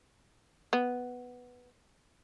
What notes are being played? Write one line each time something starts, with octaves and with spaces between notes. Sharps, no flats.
B3